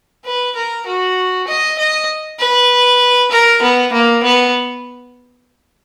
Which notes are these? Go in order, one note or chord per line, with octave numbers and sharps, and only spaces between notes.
B4
A#4
F#4
D#5
D#5
B4
A#4
B3
A#3
B3